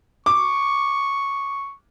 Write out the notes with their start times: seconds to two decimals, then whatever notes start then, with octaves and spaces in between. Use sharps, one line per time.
0.26 C#6 D6